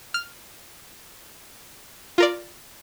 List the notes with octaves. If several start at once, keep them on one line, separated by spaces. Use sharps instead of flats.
F6
F4 A#4 D5